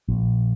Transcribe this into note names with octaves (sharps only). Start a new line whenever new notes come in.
A#1